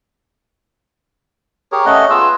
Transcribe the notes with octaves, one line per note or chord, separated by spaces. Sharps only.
G4 G#4 A#4 C#5
A3 C#4 D#5 F#5
B3 F4 G#4 E6